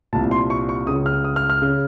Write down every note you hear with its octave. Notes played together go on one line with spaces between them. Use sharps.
C2 A#2 A5
C6
C#6
C#6
C#2 C#3 D#6
F6
D#6
F6
F6
C#3